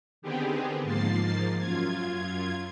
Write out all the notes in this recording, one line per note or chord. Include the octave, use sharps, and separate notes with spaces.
D3 D#3 B3 C4 G4 G#4
G#2 F3 A#3 A6 C7
F#2 F4 G#6